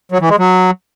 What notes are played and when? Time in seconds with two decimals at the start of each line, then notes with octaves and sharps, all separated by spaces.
0.12 F#3
0.21 E3
0.30 G#3
0.39 F#3